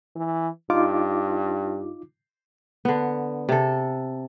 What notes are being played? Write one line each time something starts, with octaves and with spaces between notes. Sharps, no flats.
E3
G2 D#4 F4 D6
D3 B3
C3 A4